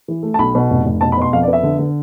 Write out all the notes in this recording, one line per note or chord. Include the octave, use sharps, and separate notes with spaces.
E3
A3
A5
B1 B5
B2
F1
F1
B2 A5
B5
B2 C6
F2 F5
D5
B3
E5
D3
D3